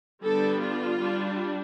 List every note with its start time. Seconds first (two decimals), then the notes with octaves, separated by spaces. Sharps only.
0.22 D3 G3 B3 D4 A4
0.60 F4
0.98 G3 D4